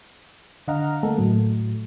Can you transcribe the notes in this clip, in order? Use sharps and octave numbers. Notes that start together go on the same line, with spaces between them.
D3 D#5 F5 F#5 A#5 F6
A3 A#3 A4
A2 F#3 A3